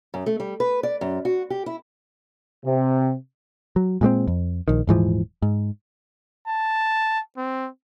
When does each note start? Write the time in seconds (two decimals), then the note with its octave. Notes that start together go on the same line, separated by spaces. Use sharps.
0.14 F#2
0.26 A3
0.40 G3
0.60 B4
0.83 D5
1.01 F#2
1.25 F#4
1.50 G4
1.66 E4
2.65 C3
3.76 F#3
4.01 A#2 G#3 A3 C4
4.28 F2
4.68 A#1 D#3
4.87 D#1 G#2 E3 F3
5.42 G#2
6.47 A5
7.37 C4